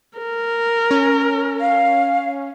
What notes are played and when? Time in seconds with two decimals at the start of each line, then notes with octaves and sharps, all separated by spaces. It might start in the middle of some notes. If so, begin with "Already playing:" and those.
0.18 A#4
0.91 C#4
1.60 F5